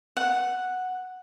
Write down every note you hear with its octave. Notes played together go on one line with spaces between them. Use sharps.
F#5